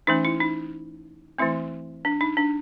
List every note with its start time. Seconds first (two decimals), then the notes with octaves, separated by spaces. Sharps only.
0.07 E3 A3 C#4 D#4
0.25 E4
0.40 D#4
1.38 E3 A3 C4 E4
2.05 D4
2.21 D#4
2.37 D4